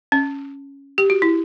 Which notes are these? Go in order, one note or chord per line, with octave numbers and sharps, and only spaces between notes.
C#4
G4
F#4
E4